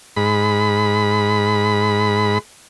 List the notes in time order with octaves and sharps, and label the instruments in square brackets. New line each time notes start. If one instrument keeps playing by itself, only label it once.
[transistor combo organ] G#2 B5